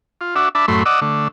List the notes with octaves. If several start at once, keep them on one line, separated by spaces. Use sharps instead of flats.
F4
D4 F#4 E5
D4 E5 A5 B5
F#2 A2 A3 B5 C6
D5 D#5 F#5 E6
D3 A3